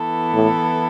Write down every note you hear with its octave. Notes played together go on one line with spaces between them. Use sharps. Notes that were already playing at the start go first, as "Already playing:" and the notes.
Already playing: E3 B3 E4 A4
A2